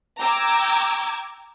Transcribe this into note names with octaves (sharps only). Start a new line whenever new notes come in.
G5 A#5 D6 E6 G#6